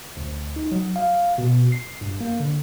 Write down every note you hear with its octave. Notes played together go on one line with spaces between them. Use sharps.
D2
D#4
F#3
F5
B2
C7
G2
A#3
D3